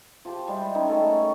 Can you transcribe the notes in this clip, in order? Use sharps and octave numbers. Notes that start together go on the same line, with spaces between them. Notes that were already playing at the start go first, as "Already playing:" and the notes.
F3 G4 A5 D6
G3 G#3 E4 G5
D#3 C#4 D#4 B4
A3 A4 A#4
C#5